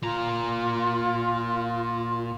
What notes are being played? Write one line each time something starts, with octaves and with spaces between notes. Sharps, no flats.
A#2 F4 A#5